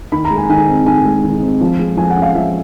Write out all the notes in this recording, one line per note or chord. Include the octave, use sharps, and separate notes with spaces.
D#3 B5
A#5
G#3
G#5
D#3 G#5
C4
D#3 G#5
G#3
D#3
C4
F3
G#3
F3 G#5
F#5
C#4
F5
F3 E5